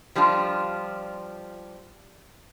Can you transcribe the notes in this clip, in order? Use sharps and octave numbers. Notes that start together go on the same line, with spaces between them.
F3 G3 D4 F4